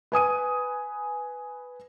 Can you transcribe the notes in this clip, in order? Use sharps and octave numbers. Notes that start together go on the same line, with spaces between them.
B4 G#5 D#6 D#7